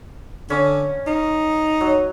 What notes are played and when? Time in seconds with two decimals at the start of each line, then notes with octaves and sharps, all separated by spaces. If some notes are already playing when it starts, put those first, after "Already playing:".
0.50 D3 C#4
1.07 D#4
1.81 F#3